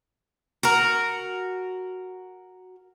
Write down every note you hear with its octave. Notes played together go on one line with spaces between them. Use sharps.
F#4 A#4